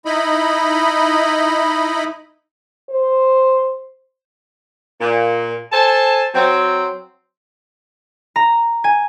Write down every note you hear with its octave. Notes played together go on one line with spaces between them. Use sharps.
D#4 E4 D#5 B5
C5
A#2
A4 C5 G#5 A5
F#3 C4
A#5
G#5